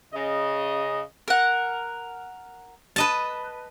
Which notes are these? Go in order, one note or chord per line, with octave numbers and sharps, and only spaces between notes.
C#3 D#5
A#4 F#5
B4 D#5 A5